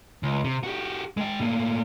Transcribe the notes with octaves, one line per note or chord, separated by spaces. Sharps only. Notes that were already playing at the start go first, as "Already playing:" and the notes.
C#2
C3
F#4 G4
G#3 G5
A2 A#3